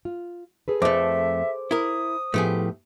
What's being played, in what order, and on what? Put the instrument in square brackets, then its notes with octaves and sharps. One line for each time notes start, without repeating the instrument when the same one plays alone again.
[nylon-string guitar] F4
G#4 A4 B4
[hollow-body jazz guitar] F2 A3 [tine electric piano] C5 D6 [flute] E5
[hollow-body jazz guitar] E4 A#4 [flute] D#6
[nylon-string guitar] A2 F3 B3 [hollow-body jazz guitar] A3 G4 G#4